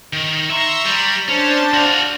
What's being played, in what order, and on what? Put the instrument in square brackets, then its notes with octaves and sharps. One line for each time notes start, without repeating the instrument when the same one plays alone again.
[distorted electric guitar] D#3
[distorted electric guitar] E5 [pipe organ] A#5 C6 C#6
[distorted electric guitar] G3
[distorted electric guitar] C#4 [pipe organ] D4 C5 A5
[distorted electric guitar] F#4 F5